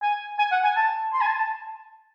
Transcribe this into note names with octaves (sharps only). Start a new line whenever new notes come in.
G#5
G#5
F#5
G#5
A5
C6
G#5
A5
A5